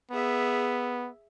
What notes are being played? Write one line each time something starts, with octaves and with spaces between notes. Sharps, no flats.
B3 G#4 E5